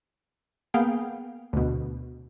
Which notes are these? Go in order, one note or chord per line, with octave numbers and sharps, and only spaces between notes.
A#3 B3 G#4 F5 G5
D2 B2